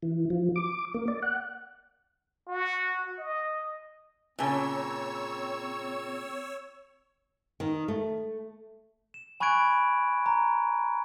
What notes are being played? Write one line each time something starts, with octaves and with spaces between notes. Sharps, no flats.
E3
F3
D6
A#3
D5
F#5
F#4
D#5
A#2 C#3 C4 B4 C#5 G#5 A5 E6
D#3
A3
E7
G#5 B5 C#6 F#6 G#6 D7
A#5